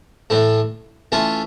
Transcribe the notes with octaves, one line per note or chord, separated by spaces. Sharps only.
A2 E3 A3
E3 A3 C#4 F4